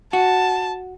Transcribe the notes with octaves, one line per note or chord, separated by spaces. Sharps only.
F#4 A5